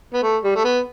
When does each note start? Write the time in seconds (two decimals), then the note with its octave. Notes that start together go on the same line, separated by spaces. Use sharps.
0.14 B3
0.23 A3
0.43 G3
0.56 A3
0.64 B3